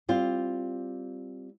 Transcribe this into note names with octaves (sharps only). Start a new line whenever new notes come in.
G3 C4 F4